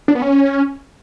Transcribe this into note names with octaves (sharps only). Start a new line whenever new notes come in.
D4
B3
C#4